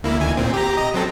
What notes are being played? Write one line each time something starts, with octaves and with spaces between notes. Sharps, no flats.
D2 A#3 E4
D2 D#3 G#5
A#2 C4
G4 A#5
D#5 A#5
F#3 C4 A4